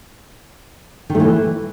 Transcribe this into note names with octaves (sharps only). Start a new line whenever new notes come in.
D#3
A3
E3